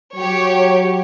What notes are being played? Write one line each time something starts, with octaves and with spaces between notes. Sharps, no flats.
F#3 G4 C#5